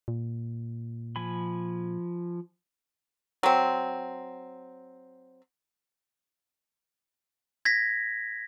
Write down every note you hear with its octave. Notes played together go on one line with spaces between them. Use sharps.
A#2
F3 G#5 B5
F#3 C4
G#6 A#6 B6